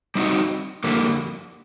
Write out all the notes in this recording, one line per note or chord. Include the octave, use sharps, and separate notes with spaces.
G3 C4 D#4 F#4
F2 D3 G3 A#3